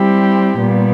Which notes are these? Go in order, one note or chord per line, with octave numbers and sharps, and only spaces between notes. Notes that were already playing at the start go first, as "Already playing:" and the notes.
Already playing: G3 C4 E4 G4
A#2 G3 B3